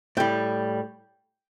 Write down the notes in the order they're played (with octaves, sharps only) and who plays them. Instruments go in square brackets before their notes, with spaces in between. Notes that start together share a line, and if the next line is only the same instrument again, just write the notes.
[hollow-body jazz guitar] A2 G3 G5